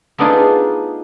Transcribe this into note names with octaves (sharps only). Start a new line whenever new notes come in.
A3 B3 D4 D#4 F4 G#4